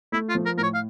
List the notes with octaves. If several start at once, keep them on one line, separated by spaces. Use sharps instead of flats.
A3 E4
F4
F3
A#4
A2 A#4
C#5
F5